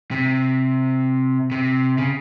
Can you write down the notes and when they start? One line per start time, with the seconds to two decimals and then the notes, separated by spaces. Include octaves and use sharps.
0.11 C3
1.51 C3
1.98 C#3